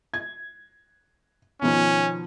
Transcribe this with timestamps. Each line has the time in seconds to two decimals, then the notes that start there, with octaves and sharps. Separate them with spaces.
0.14 G#6
1.62 B2 D#3 F3 C#4